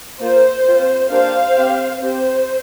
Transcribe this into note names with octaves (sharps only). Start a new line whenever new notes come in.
A#3 F4 C5
C4 F4
A#3 D4 G4 C5 F5
C4 G4
C4 G4 C5